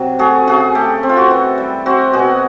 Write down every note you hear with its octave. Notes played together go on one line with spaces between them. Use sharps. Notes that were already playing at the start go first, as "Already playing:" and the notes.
Already playing: C3 F#3
A3 F#4 G#4
C#3 F#4 G#4
A3 G4 A4
C4
F4
F#4
E3
G3
C4 F#4
B2 F#4 G#4